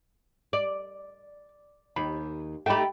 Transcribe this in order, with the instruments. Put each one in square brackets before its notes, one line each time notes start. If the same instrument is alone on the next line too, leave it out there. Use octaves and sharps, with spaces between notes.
[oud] D5
[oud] D#2 [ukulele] B5
[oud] A3 D#4 G4 [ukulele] G5 B5